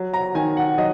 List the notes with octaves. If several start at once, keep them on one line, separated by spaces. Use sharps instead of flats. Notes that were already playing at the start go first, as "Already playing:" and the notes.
Already playing: F#3
A#5
D#3 G#5
F#5
F#3 D#5